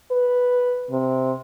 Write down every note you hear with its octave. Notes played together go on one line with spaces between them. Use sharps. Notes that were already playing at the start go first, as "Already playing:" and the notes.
B4
C3